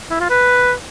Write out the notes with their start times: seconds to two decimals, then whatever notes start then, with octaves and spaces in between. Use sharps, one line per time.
0.11 E4
0.20 F4
0.30 B4